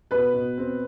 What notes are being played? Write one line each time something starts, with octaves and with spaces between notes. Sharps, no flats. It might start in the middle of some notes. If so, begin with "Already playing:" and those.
B2 B4 B5
B2
C4